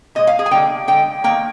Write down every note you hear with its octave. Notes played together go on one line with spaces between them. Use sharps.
A#2 G#3 D#5
F5
G#4
G#5
D3 G3 A#3 G5
D3 G#3 G5
D#3 A#3 G5